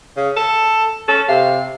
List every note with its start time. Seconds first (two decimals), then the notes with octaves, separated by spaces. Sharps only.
0.17 C#3
0.37 A4
1.08 C#4 A4
1.28 C3 F5